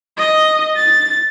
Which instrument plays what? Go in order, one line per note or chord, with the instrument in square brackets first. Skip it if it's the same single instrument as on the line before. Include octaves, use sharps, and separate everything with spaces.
[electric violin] D#5
A6